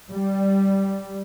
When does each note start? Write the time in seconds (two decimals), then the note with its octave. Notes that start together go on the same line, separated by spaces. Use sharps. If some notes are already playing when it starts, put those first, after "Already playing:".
0.10 G3